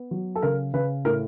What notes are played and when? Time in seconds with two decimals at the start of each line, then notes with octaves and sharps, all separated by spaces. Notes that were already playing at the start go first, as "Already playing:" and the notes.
Already playing: B3
0.11 F#3
0.35 A4
0.42 C#3 A#4
0.74 C#3 B4
1.05 A2 A#4